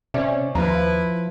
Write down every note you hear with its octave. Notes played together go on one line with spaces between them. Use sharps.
C3 C#4 C5 D5 E5
D#2 F3 E4 B4 A#5